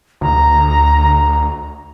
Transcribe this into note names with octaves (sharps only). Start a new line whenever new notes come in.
D2 A#5